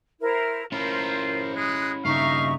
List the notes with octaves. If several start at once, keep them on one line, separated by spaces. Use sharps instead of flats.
E4 A#4 C5
C#4 E4 F4 A#4 C5
G#3 D#6 F#6
G2 C#3 D#4 E5 F5 C#6